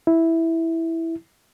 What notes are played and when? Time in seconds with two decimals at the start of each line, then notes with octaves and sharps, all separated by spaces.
0.07 E4